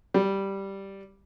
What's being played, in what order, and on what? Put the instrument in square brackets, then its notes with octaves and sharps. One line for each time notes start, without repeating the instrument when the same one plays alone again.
[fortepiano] G3